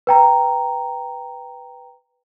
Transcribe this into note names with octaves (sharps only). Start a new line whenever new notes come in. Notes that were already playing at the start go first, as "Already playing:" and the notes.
B4 G5 A#5